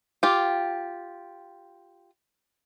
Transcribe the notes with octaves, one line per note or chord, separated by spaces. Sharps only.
F4 G4